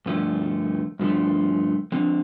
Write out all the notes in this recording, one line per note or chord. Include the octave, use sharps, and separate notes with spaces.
G2 D3 F3 A3
G2 D3 F3 A3
D3 F3 C4